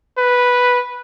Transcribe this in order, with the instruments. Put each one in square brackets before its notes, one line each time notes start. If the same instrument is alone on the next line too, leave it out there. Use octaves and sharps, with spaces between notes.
[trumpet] B4